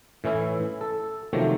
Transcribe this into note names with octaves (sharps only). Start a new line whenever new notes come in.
A2 E3 C#4 E4
A4
C3 D#3 F3 F#3 A3 A#3